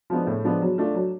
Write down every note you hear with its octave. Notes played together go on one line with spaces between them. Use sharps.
F3 G#3 B3 D4
A2
F3 G#3 B3 D4
F#3
A3 D4 F4
F#3